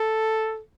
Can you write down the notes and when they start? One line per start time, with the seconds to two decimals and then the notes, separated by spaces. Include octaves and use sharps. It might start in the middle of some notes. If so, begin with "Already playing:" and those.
Already playing: A4